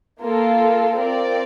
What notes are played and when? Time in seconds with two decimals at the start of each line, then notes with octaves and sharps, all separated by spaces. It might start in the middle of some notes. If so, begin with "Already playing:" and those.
0.23 A#3 F4 A4
0.99 C4 F4 A#4 D5